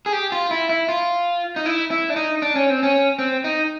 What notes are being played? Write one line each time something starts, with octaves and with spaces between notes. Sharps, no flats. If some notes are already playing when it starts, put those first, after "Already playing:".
G#4
G4
F4
E4
E4
F4
D#4
E4
E4
D4
D#4
D4
C#4
C4
C#4
C4
D#4